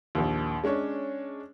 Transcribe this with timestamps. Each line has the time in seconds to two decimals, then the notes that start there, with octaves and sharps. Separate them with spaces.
0.15 A#1 D#2
0.64 G#3 C#4 D4 C#5